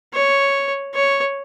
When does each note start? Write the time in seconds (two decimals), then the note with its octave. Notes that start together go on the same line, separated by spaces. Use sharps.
0.13 C#5
0.94 C#5